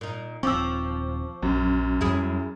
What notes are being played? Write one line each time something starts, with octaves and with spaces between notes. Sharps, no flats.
A#2 D#4
D#1 F3 C4 C#6 D6 E6
A#1 F#2
F2 F#3 G3 E4 G#4